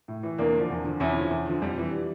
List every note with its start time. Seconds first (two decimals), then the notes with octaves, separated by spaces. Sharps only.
0.08 A2
0.23 E3
0.38 E2 A#3 D4
0.54 D3 F3
0.70 E2
0.85 D3 F3
1.00 E2 C#4 E4
1.15 D3 F3
1.30 E2
1.46 D3 F3
1.61 F2 G3
1.78 E3